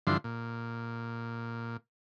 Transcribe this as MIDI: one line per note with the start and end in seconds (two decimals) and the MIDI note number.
0.07 0.17 43
0.07 0.17 50
0.07 0.17 52
0.07 0.17 53
0.07 0.17 84
0.24 1.77 46